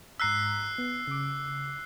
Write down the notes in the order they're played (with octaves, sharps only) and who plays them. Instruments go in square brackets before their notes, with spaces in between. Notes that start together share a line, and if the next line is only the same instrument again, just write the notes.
[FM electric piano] G#2 A#5 B6 [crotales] E6 F#6 C7
[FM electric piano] B3
C#3 D6